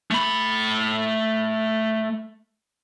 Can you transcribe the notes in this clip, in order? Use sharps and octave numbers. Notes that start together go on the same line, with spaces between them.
A3 B5